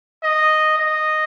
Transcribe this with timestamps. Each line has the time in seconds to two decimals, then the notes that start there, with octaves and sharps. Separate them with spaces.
0.23 D#5
0.78 D#5